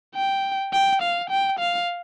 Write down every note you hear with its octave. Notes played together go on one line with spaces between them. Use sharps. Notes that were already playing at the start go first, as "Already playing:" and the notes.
G5
G5
F5
G5
F5